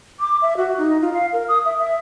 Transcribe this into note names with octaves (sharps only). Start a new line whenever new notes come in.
D6
E5
F#4
D#4
F4
F5
A#4
D#6
E5
E5